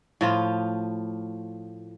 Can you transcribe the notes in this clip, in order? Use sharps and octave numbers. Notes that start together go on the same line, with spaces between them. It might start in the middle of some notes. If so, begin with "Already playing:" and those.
A2 F3 F4